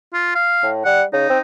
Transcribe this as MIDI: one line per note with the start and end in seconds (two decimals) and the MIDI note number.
0.13 0.32 65
0.35 0.69 77
0.62 0.81 45
0.85 1.03 55
0.85 1.02 78
1.13 1.29 49
1.13 1.41 63
1.29 1.39 60